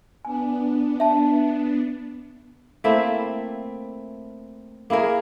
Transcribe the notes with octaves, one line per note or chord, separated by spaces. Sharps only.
B3 D4 G#5
E5 A5
A3 A#3 C4 E4
A#3 E4 G#4 A#4